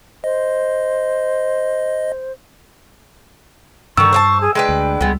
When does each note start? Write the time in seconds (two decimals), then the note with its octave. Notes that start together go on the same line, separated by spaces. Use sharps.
0.24 C5 D#5
3.97 G2 D3 D#3 C#6 E6
4.13 C5 C#5 A5
4.41 G#4
4.55 G#3 D4 B4 G5
4.69 D2
5.01 C#2 G3 G#3 B3